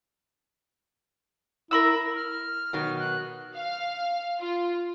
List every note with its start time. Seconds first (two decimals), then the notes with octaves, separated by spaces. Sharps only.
1.71 E4 A#4 B5 E6
2.16 F6
2.73 B2 D#3 F#3
3.00 F#6
3.55 F5
4.39 F4